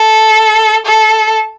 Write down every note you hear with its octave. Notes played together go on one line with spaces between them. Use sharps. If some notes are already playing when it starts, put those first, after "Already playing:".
Already playing: A4
A4